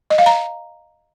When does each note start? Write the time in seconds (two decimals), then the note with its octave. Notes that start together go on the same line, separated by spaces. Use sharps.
0.10 D#5
0.18 F5
0.26 A#5